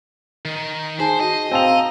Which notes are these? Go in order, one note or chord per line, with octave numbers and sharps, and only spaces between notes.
D#3
D#4 G#4 C5 A5
F#4 D#5
C4 F5 A5 A#5 E6 F7